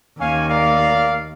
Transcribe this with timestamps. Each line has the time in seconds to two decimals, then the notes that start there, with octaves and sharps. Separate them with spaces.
0.20 D#2 C#4 F5 G#5
0.49 A#4 D5 F5